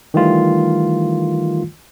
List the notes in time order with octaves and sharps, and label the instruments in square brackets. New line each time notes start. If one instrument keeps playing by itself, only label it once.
[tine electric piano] D#3 E3 G3 A3 F4